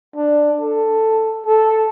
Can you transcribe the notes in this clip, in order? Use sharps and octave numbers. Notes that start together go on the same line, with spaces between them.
D4
A4
A4